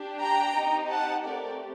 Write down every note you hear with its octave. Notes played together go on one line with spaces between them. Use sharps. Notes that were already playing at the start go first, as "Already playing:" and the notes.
Already playing: D4 G4
G5 A#5
C4 D#4 G4
F#5 A5
A3 C4 G4 A#4 D5